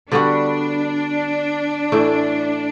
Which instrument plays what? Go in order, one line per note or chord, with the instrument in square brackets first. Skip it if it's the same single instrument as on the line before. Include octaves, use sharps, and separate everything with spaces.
[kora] D3 G3 B3 F#4 [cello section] D4
[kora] A2 E3 A3